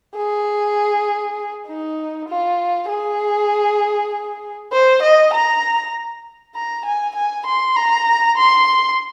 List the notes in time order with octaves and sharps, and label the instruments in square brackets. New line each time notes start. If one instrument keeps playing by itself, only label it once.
[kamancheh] G#4
D#4
F4
G#4
C5
D#5
A#5
A#5
G#5
G#5
C6
A#5
C6